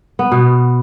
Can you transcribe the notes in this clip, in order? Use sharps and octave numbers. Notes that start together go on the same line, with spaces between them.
B3
B2